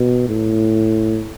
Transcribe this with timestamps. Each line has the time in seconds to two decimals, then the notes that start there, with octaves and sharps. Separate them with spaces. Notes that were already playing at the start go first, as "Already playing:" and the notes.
Already playing: B2
0.28 A2